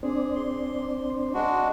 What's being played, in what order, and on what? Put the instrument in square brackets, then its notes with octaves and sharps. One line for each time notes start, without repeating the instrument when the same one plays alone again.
[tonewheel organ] C4 D4 [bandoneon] G#4
[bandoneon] C6
G#3 D4 F#4